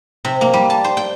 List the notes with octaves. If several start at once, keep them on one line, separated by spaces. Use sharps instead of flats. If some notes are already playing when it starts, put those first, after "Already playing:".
C3
A#3
G3
A5
C5
G5